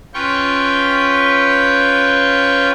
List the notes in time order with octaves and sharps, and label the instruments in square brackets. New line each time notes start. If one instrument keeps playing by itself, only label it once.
[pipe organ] C#4 F4 B4 G5 C#6